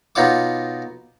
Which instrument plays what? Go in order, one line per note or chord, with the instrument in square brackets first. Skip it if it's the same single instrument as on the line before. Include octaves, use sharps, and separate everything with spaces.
[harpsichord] B2 D#4 F4 C#5 F#5 D6